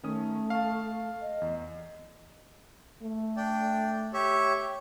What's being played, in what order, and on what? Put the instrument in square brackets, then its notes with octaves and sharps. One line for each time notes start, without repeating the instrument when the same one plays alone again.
[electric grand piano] D#3 C#4 D#6 [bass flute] A3
[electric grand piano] F5 A5
[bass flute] D#5
[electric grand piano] E2
[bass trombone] A3
[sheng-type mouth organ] D4 D5 G5
G4 C#5 E5